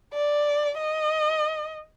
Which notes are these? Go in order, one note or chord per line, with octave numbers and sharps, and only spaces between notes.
D5
D#5